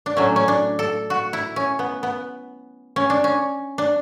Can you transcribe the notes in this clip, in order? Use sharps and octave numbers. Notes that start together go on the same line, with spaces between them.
D4
A2 F#3 A3 C#4
C#4
D4
A4
F#4
E4
C#4
B3
B3
C#4
D4
C#4
D4